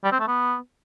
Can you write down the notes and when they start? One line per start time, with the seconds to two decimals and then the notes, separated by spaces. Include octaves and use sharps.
0.04 G3
0.12 C4
0.20 A3
0.28 B3